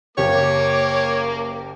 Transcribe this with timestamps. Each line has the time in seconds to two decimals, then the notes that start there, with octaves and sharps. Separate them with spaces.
0.18 F#1 A#3 G4 C#5 D6